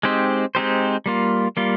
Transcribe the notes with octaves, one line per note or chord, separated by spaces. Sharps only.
G#3 C4 D#4 G4 C5
G#3 C4 D#4 G4 C5
G3 A#3 F4
G3 A#3 F4